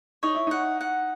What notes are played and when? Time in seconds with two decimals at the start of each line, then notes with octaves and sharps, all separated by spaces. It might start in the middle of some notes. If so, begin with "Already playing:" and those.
0.23 D#4 C#5
0.35 E4
0.47 D#4 F#5
0.81 F#5